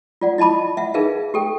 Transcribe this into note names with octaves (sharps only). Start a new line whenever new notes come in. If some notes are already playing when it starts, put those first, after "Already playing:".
F4 D5 F#5
E4 D#5 A5 B5 D6
E5 F#5
D#4 G#4 A#4 B4 E5 F5
G4 A4 G5